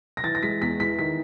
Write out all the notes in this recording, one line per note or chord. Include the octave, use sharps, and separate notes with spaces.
A#6
E3 A6
A#6
G#3 B6
E2 B6
E3 B6
D#3 B6